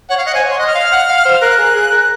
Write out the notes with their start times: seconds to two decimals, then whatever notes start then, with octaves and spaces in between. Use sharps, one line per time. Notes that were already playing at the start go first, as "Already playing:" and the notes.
0.10 C#5 F#5
0.17 F5
0.26 D#5 F#5
0.34 C5 G#5
0.43 C#5
0.51 C6
0.59 D#5 F#6
0.67 F6
0.75 F5
0.92 F#5
1.09 F5
1.25 C5
1.41 A#4 F#6
1.58 G#4
1.75 G#4
1.91 A#4
2.01 F#6